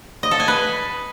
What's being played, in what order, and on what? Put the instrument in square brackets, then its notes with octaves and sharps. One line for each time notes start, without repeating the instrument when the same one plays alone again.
[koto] D#5
A4
G#5
B4